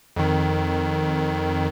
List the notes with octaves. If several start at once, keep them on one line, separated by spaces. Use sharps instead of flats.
F2 D#3